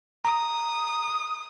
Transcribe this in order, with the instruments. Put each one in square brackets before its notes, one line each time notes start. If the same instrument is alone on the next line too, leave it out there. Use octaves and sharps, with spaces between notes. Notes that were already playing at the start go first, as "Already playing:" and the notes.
[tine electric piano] A#5 [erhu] D#6